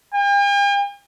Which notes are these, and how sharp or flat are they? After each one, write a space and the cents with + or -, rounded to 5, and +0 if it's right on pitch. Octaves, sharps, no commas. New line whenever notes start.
G5 +45